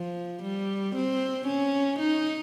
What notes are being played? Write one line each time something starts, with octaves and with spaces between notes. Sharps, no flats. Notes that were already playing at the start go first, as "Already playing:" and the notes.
Already playing: F3
G3
C4
C#4
D#4